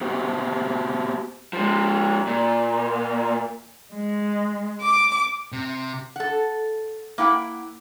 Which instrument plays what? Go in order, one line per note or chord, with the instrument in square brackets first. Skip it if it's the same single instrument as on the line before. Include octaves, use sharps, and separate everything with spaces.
[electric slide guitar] B3 F#4 G4 C5
[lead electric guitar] F3 G#3
A#2
[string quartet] G#3
D6
[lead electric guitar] C3
[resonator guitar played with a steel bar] A4 F#5
A#3 E4 F#5 G5